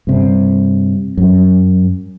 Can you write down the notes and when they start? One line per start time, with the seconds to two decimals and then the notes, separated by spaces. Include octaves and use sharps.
0.07 G2 C3
1.17 F#2